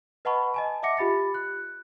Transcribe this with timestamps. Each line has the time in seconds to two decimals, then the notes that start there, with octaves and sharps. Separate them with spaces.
0.25 B4 D#5 F#5 A5 B5 C#6
0.54 D#5 G#5 A5
0.83 D#5 E5 F#5 D6 A#6 C#7
0.97 F4 G4 B5 A6 C#7
1.34 F#6